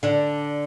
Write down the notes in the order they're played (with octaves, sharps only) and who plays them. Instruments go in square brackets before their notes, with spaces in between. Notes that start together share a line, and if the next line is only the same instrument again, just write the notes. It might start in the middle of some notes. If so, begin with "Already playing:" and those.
[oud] D3 D4